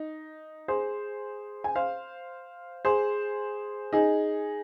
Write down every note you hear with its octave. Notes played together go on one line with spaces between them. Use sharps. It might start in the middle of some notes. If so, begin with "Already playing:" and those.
Already playing: D#4
G#4 C5
G#5
C5 F5
G#4 C5
D#4 G#4